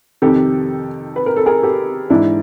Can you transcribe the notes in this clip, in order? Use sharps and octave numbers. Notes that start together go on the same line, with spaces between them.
F2 C3 D#3 G4 A4
B4
A#4
A4
G#4 A#4
G4 A4
G#2 E3 D4 E4